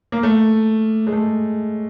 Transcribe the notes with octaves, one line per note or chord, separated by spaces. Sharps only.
A#3
A3
G#3
A3